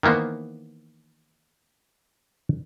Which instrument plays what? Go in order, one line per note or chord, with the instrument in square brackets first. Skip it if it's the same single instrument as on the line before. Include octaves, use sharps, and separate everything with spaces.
[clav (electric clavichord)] D#3 E3 A#3 B3 C5